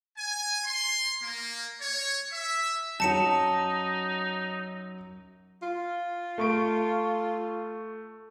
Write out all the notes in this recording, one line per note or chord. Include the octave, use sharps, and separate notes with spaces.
G#5
C6
A#3
C#5
E5
F#2 F#3 D#4 A5 C#7 E7
F4
A3 C#6 D7